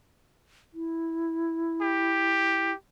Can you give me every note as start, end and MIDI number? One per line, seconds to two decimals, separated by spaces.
0.74 2.72 64
1.82 2.75 67